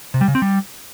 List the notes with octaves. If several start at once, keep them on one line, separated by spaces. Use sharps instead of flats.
C3
G3
C#3
C4
G3